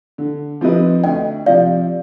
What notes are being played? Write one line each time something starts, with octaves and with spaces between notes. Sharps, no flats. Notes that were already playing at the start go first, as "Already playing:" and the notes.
D3
F3 C4 D#4 B4
D2 D#5 G5
C3 F3 D5 F5